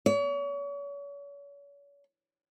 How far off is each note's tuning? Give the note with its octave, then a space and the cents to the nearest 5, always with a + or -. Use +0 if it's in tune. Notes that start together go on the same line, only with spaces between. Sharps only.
C#5 +40